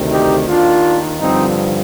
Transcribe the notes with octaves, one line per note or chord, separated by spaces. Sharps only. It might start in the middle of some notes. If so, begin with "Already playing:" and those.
Already playing: D2 C3 D#3
D#4 G4
D#2 D#3 D4 F4
G2 D3 F3 C4 D#4